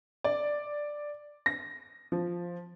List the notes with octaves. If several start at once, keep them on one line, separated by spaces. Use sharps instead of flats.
D5
A#6
F3